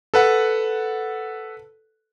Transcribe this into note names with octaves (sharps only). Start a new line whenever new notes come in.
A4 B4 F#5